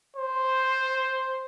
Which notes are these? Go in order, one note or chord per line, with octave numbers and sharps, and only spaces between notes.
C5